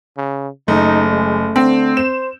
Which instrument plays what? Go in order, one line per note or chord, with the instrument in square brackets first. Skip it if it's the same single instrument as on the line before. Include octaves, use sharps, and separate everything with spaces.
[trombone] C#3
[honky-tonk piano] F#1 [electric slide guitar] A3 [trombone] D#4
[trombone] G#3
[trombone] D3 [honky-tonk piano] C4
[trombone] C5 [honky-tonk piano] E7